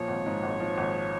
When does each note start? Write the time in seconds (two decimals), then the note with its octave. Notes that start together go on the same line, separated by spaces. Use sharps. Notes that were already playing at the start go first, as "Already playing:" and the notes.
Already playing: A#2 F3 C#5
0.08 G#1
0.26 G#2
0.43 G#1
0.60 F3
0.78 G#1